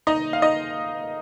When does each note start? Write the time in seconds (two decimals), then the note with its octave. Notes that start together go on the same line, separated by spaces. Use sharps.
0.07 D#4 D#5
0.33 F5
0.42 D#4 D#5